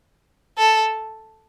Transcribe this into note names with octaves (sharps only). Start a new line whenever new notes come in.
A4